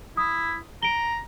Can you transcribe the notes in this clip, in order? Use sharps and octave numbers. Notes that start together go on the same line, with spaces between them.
E4 D#6
A#5 D7 G7